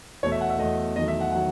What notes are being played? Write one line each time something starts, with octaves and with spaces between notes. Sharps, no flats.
E2 B2 A3 C#5
E5
F#5
E5
E2 B2 A3 D#5
E2 D#3 F#3 A3 D#5
E5
F#5
D#3 F#3 F#5